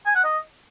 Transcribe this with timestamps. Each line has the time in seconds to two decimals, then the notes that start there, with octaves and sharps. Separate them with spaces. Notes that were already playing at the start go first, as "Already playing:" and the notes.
0.06 G#5
0.15 F#5
0.24 D#5